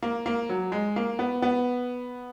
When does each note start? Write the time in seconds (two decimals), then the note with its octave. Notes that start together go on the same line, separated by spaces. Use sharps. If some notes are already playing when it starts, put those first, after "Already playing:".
0.03 A#3
0.26 A#3
0.49 F#3
0.72 G#3
0.96 A#3
1.19 B3
1.42 B3